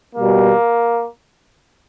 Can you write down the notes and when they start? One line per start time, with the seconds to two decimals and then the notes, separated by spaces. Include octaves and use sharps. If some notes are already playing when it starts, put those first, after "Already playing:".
0.16 B2 G3 A#3